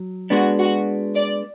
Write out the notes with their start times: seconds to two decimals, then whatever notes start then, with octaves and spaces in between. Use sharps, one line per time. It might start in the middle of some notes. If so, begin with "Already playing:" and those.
Already playing: F#3
0.30 G#3 B3 D4 F#4
0.59 F#4
1.15 D5